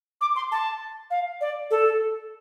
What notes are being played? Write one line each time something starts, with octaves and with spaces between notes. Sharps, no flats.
D6
C6
A5
F5
D5
A4